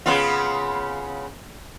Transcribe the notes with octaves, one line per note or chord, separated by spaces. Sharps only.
C#3 B3 F4